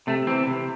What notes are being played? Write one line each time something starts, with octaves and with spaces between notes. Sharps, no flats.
C3 A3
E3 C4
C3